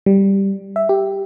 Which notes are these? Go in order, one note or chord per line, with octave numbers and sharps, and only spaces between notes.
G3
E5
G4